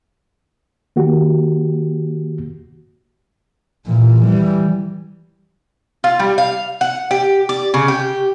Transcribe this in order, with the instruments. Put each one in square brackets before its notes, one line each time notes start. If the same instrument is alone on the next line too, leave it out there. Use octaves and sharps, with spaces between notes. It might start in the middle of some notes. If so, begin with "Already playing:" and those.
[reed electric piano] D#3 A#3 F#4 G4
[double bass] A#2 E3
E3 G3
[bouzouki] F4
G3
F5
F#5
G4
D5
C#3
G4